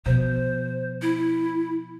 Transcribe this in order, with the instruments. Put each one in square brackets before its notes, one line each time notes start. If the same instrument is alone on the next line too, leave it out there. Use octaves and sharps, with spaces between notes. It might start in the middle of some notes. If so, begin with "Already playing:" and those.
[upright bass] B2 F3 [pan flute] C5
[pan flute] E4